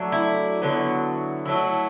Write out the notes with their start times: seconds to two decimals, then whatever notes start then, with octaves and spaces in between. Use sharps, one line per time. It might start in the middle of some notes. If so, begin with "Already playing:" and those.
Already playing: F#3 A3 D4
0.12 E4
0.62 D3 F#3 B3
1.46 F#3 A3 E4